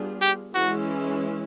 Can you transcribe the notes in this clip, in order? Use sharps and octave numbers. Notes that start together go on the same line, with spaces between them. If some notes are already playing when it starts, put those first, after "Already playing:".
Already playing: G3 B3 D4 F4 G#4
G4
E3 G#3 C#4 E4 F#4